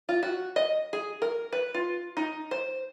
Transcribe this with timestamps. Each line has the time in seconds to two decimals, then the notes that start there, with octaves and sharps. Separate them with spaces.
0.09 F4
0.23 F#4
0.56 D#5
0.93 G#4
1.22 A#4
1.53 B4
1.74 F4
2.17 D#4
2.51 C5